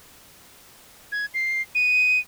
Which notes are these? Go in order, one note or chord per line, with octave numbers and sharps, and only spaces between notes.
G#6
C7
D#7